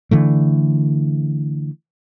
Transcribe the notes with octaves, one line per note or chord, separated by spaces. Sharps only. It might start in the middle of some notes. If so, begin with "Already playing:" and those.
D3 E3 A3